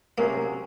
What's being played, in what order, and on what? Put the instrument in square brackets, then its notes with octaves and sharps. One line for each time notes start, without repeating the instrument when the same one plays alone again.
[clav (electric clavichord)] C3 F#3 C#4 G#4 [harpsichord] A#3